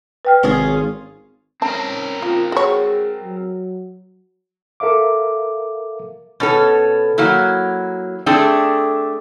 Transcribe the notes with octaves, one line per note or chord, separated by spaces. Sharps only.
B4 G5 F6
G#1 C#4 F4 G#4
C4 C#4 A#4 A5
A#3 F4
F#4 G#4 C#5
F#3
A4 A#4 E5 F5 D6
B2 C#4 A4
F#3 A#3 E4
A3 C4 D4 G#4 A4